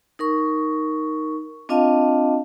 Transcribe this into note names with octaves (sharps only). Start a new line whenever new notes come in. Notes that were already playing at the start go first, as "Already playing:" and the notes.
D#4 A#4 C#6
C4 D4 F4 D#5 F5 A5